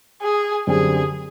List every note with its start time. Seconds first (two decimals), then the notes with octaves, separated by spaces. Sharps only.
0.22 G#4
0.67 F#2 D3 G3 C4 G#4